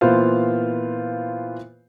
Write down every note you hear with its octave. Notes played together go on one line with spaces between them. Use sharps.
A#2 E3 B3 F4 C5 F5